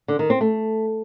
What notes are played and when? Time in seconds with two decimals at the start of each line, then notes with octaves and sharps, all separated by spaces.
0.08 D3
0.19 D#3
0.30 C4
0.41 A3